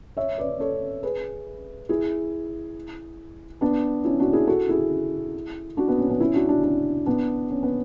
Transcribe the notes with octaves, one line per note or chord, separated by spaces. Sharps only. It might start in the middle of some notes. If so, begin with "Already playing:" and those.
C#5 E5
B4 D5
A4 C#5
G#4 B4
E4 G#4
B3 D4
C#4 E4
D4 F#4
E4 G#4
F#4 A4
E4 G#4
D4 F#4
B3
C#4
B3 D4
C#4 E4
D4 F#4
D4 F#4
D4 F#4
B3 D4
C#4
B3